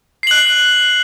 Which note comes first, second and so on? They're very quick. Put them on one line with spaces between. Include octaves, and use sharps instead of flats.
C7 F#7 F#6